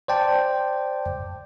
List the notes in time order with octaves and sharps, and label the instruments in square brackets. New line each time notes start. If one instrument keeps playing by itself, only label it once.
[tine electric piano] C5 D5 G5 A5